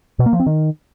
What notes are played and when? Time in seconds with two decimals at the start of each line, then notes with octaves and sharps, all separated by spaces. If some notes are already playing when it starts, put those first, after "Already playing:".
0.19 B2
0.26 A#3
0.33 F3
0.40 C4
0.46 D#3